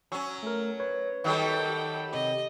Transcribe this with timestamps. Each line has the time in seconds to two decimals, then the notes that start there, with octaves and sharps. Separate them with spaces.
0.12 F#3 C#4 G#5 C#6 E6
0.43 A3 A#4
0.80 B4 C#5
1.24 D#3 F#3 G3 A4 G5
1.69 G4
2.12 C3 G4 D#5